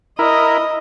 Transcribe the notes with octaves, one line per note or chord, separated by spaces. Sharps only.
E4 A#4 D#5